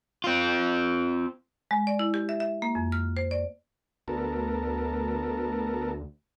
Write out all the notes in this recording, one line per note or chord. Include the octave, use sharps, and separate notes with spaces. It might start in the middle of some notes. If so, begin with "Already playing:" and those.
C4 F4
G#3
D5
E4
G4
E5
E5
A#3
F2
F6
C5
D5
D2 B3 A4 A#4